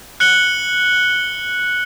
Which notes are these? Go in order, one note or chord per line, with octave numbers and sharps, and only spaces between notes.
F#6 C#7 F#7 G7